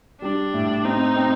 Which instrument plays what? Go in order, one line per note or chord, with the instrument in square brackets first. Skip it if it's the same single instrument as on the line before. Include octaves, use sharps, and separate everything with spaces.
[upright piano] G3 [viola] D4
[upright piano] A2
[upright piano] C4 [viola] D#4
[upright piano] C4